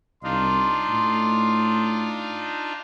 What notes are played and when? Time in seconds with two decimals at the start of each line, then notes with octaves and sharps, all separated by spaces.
0.23 C2 D4 D#4 F4 C6
0.89 A2